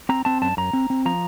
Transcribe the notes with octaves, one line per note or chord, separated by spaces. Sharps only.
C4 A#5
C4 A5
F#2 A5
F#2 A#5
C4
C4
F3 A#5